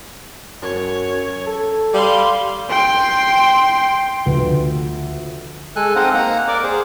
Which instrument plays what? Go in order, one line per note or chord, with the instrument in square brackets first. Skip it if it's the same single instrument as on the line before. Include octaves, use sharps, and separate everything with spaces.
[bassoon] F#2 [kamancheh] C#5
[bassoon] A4
[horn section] G3 [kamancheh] F5 C6
[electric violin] G5 C6
[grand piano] D2 F3 B4
[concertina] G#3 A4 G#5 F#6
C4 D#4 C5 D#5 F5 F#5
A#3 F#5 A#5
A#4 D5 D6
G#4 C5